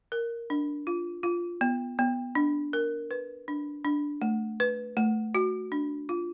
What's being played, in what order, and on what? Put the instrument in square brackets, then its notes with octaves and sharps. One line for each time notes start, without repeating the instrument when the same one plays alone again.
[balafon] A#4
D4
F4
F4
B3
B3
D4
A#4
B4
D4
D4
A3
B4
A3
F#4
D4
F4